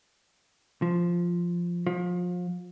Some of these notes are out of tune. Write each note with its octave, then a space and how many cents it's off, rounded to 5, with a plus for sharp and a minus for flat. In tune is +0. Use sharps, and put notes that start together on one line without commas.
F3 -5
F3 +30